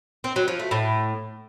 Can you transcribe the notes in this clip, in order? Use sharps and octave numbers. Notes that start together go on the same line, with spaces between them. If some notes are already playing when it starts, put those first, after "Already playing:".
C4
F#3
F3
A3
A2